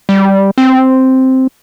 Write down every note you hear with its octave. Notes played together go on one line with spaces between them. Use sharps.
G3
C4